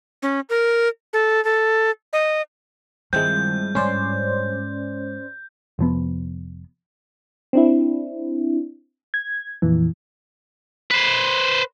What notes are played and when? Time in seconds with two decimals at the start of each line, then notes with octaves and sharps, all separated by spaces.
0.22 C#4
0.49 A#4
1.13 A4
1.45 A4
2.13 D#5
3.13 G2 D#3 F3 G#3 C4 E4 G6
3.75 G#2 C#4 C5 D5
5.79 F1 F3 B3
7.53 C4 D4 E4
9.14 G#6
9.62 F2 A#2 E3
10.91 B4 C5